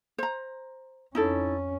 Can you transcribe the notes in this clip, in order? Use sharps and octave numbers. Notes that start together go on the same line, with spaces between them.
C5 A#5
F2 C#4 D#4 E4 A4